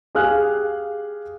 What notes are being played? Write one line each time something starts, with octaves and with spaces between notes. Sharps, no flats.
G4 G#4 F5 F6 F#6